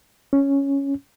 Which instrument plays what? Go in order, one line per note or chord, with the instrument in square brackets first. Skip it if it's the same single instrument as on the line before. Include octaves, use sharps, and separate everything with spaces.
[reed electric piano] C#4